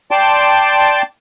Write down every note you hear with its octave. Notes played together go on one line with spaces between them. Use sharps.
D5 G5 A5 C6 D6